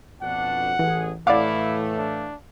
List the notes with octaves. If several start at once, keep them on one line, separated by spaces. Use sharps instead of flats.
F2 B2 D4 F#5
A1 E3 G#4
A2 E3 A3 E4 D5 F5 F#5 D6
D4